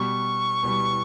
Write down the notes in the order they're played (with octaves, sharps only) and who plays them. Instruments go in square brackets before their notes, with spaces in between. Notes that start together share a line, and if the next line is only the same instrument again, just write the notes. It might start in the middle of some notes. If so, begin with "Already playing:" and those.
Already playing: [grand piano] B2 G3 B3 [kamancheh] C#6
[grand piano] B2 G3 B3